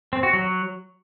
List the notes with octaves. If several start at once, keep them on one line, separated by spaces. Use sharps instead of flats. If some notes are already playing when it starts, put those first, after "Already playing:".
C4
F#4
F#3